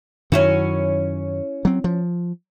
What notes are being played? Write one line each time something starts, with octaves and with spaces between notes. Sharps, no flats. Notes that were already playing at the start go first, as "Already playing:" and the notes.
F#2 D#3 F#3 C#4 E4 F#4
F#3 C4
F3